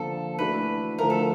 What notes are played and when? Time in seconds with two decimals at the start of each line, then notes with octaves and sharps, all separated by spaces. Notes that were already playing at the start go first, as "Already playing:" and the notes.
Already playing: D3 F3 A#3 A4
0.39 E3 A3 D4 F#4 A4 B4
0.98 D3 F3 A3 A#4
1.10 A4